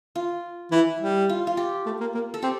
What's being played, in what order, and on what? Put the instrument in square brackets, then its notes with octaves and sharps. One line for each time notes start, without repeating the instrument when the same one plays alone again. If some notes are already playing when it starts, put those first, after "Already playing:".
[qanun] F4
[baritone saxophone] E3 [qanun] E4
[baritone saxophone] G3
[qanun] F4
F4
G4
[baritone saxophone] A3
A#3
A#3
[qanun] A4
[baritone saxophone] C4 [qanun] G4